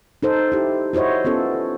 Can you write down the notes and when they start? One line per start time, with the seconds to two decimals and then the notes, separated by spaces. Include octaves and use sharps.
0.23 D#4 A4 C5
0.52 E4 G4
0.93 E4 F#4 C5 C#5 D#5
1.25 B3 C#4 F4 A4